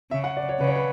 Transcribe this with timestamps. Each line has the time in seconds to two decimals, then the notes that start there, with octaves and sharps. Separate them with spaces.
0.11 C#3 E5
0.24 F#5
0.37 D5
0.49 C#5
0.60 C#3 B4
0.68 C#5
0.76 B4